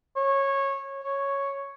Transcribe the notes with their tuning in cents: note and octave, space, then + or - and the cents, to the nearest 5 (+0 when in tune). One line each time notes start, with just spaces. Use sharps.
C#5 -15
C#5 +0